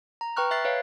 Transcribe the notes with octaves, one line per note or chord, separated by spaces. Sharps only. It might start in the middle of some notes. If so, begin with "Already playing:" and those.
A#5
B4 G5 A#5 C#6 F6 F#6
E5 F#6 A6 C7
B4 C#5 F5